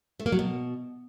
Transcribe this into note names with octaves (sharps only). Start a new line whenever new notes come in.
A3
A#3
F#3
B2